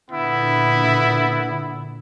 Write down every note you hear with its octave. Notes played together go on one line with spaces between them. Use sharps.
A#2 D3 B3 E4